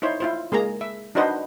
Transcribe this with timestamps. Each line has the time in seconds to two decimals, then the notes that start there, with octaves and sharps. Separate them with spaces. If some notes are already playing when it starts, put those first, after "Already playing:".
0.02 D#4 E4 C5 C#5
0.20 E4 F4 C5
0.52 G#3 A#3 G#4 A#5
0.81 E5
1.15 D4 D#4 F#4 B4 C5 D#5